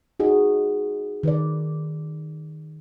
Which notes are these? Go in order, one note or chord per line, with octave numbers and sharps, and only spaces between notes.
D#4 F#4 G#4 D#5
D#3 B4 D5